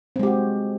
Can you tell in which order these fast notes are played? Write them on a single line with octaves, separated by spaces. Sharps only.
C4 G#3 G4 F#4